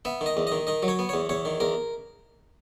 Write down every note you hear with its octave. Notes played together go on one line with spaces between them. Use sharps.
B3 E5
D#3 D#5
E2
D#3 D#5
D#3 D#5
F#3
C#5
B3
E2 C#5
E2 C#5
D#3
E2 A#4